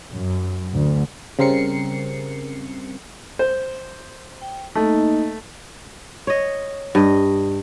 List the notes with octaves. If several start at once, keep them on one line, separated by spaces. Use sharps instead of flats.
F#2
D2
C#3 G3 C4 A#4 C7 C#7
C5
G5
A3 A#3 D#4 D#5
C#5 D#5
G2 D#5